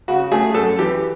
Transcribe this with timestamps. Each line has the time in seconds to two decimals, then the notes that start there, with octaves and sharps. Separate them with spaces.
0.08 C#3 F#4
0.32 A3 G#4
0.54 F#2 A4
0.79 E3 G4